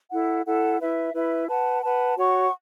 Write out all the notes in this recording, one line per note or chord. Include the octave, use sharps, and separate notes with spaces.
E4 A4 F#5
E4 A4 F#5
E4 B4 E5
E4 B4 E5
B4 F#5 A5
B4 F#5 A5
F#4 C#5 F#5 C#6